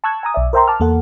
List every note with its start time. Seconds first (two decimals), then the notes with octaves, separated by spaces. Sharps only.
0.04 A5 C#6 E6 F#6 G#6
0.23 G#5 A#5 D#6
0.34 B1 D5 E5
0.53 A#4 C5 E5 G5 A#5 C6
0.67 A5 D6 F6
0.80 E2 A#3 A4 F#5